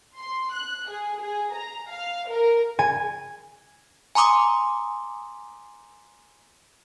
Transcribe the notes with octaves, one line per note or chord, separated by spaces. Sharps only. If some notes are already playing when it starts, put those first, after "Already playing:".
C6
F#6
G#4
G#4
A#5
F5
A#4
G#5
G#5 A#5 C6 D6 D#6